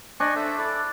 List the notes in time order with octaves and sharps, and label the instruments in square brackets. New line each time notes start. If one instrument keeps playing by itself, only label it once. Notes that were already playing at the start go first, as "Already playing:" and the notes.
[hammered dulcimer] D4 [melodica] D#5 G#5 C#6
[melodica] A4 C5 E5
E4 A4 D5